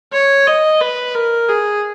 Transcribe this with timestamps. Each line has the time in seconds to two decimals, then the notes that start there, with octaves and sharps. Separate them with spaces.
0.13 C#5
0.47 D#5
0.81 B4
1.15 A#4
1.49 G#4